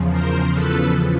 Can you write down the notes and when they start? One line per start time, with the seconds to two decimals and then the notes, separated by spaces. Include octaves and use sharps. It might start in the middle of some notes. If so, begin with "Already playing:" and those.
Already playing: E2 C#3 F3
0.09 A#4 C5
0.50 A4 B4